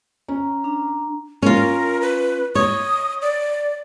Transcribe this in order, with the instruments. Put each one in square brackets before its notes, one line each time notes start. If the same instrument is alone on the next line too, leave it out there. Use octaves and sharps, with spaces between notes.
[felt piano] C#4 [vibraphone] A#5
[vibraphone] D4 A#5
[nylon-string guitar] C#4 F4 [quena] A#4
[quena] B4
[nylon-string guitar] C#5 [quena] D#6
[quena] D5